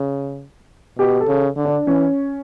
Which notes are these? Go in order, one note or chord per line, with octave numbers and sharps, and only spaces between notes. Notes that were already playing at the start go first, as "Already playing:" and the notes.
Already playing: C#3
B2 G4
A4
C#3
D3
D4
E3 C#4